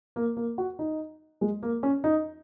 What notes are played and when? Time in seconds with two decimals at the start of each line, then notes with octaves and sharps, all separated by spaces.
0.16 A#3
0.37 A#3
0.58 F#4
0.79 D#4
1.41 G#3
1.63 A#3
1.83 C#4
2.04 D#4